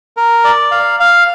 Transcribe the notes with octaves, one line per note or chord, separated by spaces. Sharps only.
A#4
D5
F5
F5